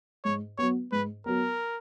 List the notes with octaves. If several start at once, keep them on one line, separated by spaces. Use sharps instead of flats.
G#2 C#5
F#3 B3 C#5
G#2 B4
F#3 B3 A#4